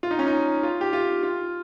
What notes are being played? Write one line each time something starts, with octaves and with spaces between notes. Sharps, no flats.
F4
D#4
C#4
D#4
F4
G4
F4
F4